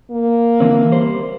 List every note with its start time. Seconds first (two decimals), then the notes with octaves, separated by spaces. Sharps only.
0.11 A#3
0.60 D3 E3 C4
0.91 G3 C5